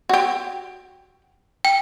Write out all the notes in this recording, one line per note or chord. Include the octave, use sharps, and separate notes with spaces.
F#4 G4
G5